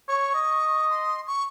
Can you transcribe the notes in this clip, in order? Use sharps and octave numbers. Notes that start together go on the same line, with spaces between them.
C#5 C#6
D#5
C6
C#6